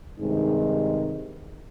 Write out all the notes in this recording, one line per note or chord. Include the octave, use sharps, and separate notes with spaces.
G2 C3 D#3 G#3 D#4